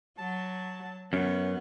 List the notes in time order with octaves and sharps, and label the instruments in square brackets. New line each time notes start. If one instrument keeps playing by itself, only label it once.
[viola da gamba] F#3 [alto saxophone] A5
[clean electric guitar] F#2 [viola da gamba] B3 [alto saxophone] C#4